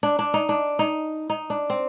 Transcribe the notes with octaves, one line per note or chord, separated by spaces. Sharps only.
D4
D4
D#4
D4
D#4
D#4
D4
C4